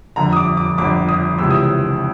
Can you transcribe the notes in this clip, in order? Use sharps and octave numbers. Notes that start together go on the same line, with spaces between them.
G1 F2 D3 A#5
D#6
D6
D6
G1 F2 D3 D6
D#6
C#2 C3 E3 E6
D#6
E6